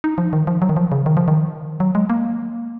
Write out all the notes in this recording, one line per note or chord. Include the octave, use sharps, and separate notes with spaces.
D#4
F3
D#3
F3
F#3
D#3
F3
C#3
D#3
F3
D#3
F#3
G#3
A#3